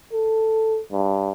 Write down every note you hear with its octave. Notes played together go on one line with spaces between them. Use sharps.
A4
G2